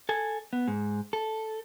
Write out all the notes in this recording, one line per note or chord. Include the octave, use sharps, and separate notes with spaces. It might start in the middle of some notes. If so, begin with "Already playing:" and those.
A4 G#5
B3
G#2
A4